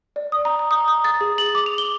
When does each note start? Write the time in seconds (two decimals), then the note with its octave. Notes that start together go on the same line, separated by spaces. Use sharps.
0.16 D5
0.32 D#6
0.45 A#5
0.59 A#5
0.71 D#6
0.88 D#6
1.04 A6
1.21 G#4
1.38 F#7
1.55 D6
1.66 F7
1.78 G7